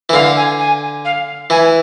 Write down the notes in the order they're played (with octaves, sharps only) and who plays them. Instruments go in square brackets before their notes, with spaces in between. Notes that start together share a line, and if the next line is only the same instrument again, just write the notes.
[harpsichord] E3
[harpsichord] D3 [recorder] F5
[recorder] G#5
G#5
F5
[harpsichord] E3 [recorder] G#5